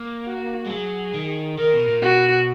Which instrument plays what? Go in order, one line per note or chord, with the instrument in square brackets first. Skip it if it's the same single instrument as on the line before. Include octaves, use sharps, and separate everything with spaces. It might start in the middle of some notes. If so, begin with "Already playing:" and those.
Already playing: [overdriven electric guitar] A#3
[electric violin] F#4
[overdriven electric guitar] G#3
[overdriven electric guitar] F#3 [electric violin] G#4
[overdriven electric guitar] D#3
[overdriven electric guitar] D#3 [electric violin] A#4
[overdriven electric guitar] B2
A#2
[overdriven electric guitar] B2 [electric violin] F#4